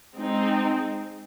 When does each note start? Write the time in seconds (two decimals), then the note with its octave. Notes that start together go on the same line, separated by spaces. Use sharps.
0.16 G#3 C4 D#4